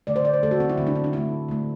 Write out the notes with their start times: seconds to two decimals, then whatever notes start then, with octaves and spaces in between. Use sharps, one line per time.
0.07 D3 A3 D5
0.16 C5
0.25 D5
0.33 C5
0.43 D3 A3 A4
0.51 F#4
0.60 C4
0.69 E4
0.78 D3 A3 C4
0.87 D4
0.95 C4
1.04 D4
1.13 D3 A3 E4
1.49 D3 A3